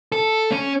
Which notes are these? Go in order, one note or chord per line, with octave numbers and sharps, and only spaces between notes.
A4
C#4